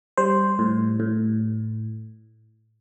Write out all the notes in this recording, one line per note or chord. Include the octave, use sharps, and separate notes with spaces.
G3 C5
A2
A2